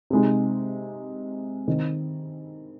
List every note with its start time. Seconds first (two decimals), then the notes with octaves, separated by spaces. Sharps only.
0.10 C3 G#3 D#4
1.67 D#3 C4 D#4